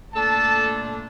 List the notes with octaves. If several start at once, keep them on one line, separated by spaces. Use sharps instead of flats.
A#2 A3 D4 A4 A5